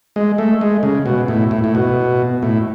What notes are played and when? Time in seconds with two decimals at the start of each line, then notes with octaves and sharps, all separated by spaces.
0.16 G#3
0.38 A3
0.61 G#3
0.83 C#3
1.06 B2
1.28 A2
1.51 A2
1.64 A2
1.75 B2
2.43 A2